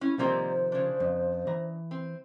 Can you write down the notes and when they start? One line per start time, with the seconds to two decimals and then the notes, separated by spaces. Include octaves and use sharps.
0.01 C#4 E4
0.19 C3 D#3 F3 G3 A#3 C4 C5
0.72 C#3 D4
1.00 F2
1.47 E3 A#5
1.91 C4